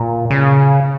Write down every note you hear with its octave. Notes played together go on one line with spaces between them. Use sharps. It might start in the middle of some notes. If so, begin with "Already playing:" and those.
Already playing: A#2
C#3